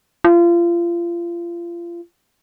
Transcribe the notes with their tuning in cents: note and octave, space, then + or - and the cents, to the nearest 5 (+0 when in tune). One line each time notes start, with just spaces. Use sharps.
F4 -30